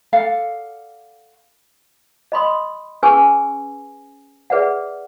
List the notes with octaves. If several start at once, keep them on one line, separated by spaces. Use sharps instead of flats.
A4 D5 F5 F#5
D#5 B5 C6 D#6
C#4 G#4 B4 G#5 C#6 E6
G#4 B4 D5 E5 F#5